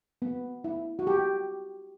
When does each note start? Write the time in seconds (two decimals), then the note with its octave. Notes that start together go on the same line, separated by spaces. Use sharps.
0.22 B3
0.64 E4
0.99 F#4
1.07 G4